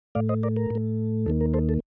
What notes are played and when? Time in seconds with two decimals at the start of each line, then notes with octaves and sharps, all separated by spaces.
0.15 A2 A3 D5 F5
0.29 C5 D#5
0.43 A#4 D5
0.56 A#4
0.70 A2 A3
1.26 D#2 D#3 A#3 A4
1.41 A#4
1.54 A4 C5
1.69 A4